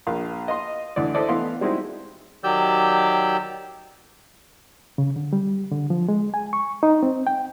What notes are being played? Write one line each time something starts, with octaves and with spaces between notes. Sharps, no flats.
A#1 F5
D#5 F5 C6
D2 D3 E3 D5
D4 E4 A4 C5 D5 D#5
E3 A3 B3 F5 C6
G3 G#3 C4 D#4 E4 F#4
D#3 F#3 G4 D5 E6 G6
C#3
D3
G3
D3
F3
G#3
G#5
C#6
D#4
C4
G5